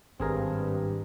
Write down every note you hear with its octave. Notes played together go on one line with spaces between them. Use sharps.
G#1 G2 C4 G#4 A#4